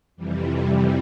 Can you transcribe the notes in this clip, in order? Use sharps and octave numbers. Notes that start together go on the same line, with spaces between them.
F2 C3 E3 G3